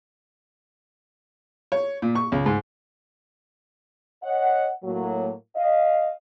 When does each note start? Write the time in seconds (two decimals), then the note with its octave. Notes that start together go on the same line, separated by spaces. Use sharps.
1.72 C#5
2.02 A#2
2.15 C#6
2.32 C#2
2.46 G#2
4.23 C#5 D#5 F#5
4.84 A2 F#3 A#3
5.56 D#5 F5